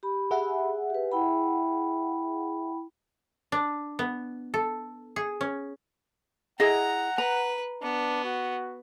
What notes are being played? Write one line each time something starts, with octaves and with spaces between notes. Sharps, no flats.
G4 B5
G#4 E5 F#5
G4 B4
E4 G5 B5
D4
B3
A4
G#4
C#4
E4 G#4 D#5 F#5 A#5
B4 A#5
B3 D4
F#4